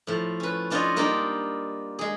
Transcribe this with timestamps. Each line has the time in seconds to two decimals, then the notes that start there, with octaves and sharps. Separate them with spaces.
0.07 A2 F3
0.40 C#4 B4
0.70 C#4 D4 F4 C5 C#5 D#5
0.96 G3 A#3 D4 D#4 F4 G4
1.99 G#3 G#4